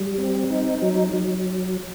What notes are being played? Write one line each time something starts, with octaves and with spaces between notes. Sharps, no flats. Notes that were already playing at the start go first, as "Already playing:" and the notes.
Already playing: G3
C4
D#4
F#3
F#3